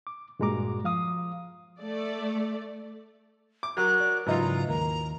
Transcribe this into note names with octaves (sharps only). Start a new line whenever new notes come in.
D6
G2 A#2 G#3 F#4 A#5 D6
F3 F5 D#6
A3 D5
D6
F#3 A#4 F#6
D5
G#2 C#3 E3 F#3 D#4 F4 A#5
D#2 A#3 A#5